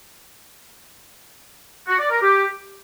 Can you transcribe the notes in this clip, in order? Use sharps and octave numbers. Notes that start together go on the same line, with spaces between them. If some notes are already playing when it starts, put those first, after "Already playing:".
F#4
D5
A#4
G4